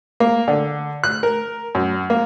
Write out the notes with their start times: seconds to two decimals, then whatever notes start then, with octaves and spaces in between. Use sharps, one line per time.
0.20 A#3
0.48 D3
1.04 F#6
1.23 A#4
1.75 F#2
2.10 A#3